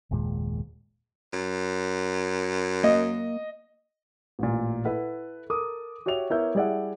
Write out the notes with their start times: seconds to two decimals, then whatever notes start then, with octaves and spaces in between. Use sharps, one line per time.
0.11 F#1 D#2 A#2 G#3
1.33 F#2
2.84 A#3 D#5
4.39 A1 A#2
4.85 E4 A4 B4 F#5
5.50 A4 A#4 D6 D#6
6.06 F#4 G4 C#5 E5 F7
6.30 B3 E4 A#4 C#5 E5 G6
6.55 G3 E4 G#4 D5 E5 F#5